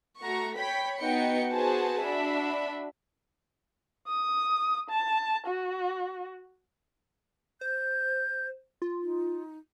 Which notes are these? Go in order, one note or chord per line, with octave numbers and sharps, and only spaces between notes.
A3 F#4 A#5 C#6
C#5 G5 B5 B6
B3 D#4 F#4 G5 C#7
B3 F#4 G#4 C5 A5
D4 F#4 E5 B5
D#6
A5
F#4
C5 G6
F4
D#4